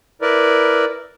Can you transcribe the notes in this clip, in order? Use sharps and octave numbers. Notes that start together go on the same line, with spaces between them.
E4 A#4 B4 D5